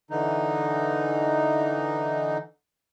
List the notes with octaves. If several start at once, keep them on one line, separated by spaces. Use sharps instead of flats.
D3 E3 D#4